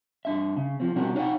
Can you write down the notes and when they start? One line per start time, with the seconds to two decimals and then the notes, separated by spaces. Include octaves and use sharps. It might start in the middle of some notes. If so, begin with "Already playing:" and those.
0.25 G2 D4 E5
0.56 C#3
0.80 E2 F3 C4
0.95 B2 G3 C4 C#4 F#4 A#4
1.15 D#4 C#5 D5 F5 F#5